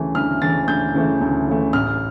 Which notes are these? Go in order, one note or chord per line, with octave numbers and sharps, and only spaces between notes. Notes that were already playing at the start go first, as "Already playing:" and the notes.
Already playing: D2 C#3 E3 A3
D2 F6
C#3 E3 A3 A6
D2 G6
C#3 E3 A3
D2
C#3 E3 A3
A1 F6